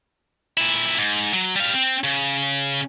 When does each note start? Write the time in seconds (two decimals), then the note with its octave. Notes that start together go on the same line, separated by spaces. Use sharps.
0.57 A#2 E4
0.98 G#2
1.33 F#3
1.56 G3 F5
1.73 C4
2.04 C#3